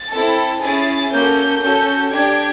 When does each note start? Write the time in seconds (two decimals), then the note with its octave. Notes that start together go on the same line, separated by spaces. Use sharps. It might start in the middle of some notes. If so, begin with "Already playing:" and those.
Already playing: A6
0.13 C4 E4 A4
0.63 C#4 E4 G#4 A6
1.12 A#3 C#4 F#4 A4 G6
1.62 C#4 F#4 A4
2.11 D4 G4 G#6